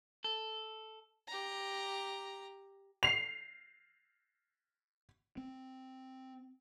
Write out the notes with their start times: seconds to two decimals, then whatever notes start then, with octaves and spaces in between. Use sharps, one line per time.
0.24 A4
1.28 G4 A#5
3.03 C7 F7
5.37 C4